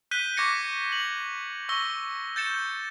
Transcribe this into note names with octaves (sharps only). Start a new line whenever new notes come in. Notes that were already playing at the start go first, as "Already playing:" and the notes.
F#6 G6 B6 D#7 G7
C#6 D6 G#6 A#6 C#7
F#7
C#6 E6 A#6 G7
G6 A6 C#7 E7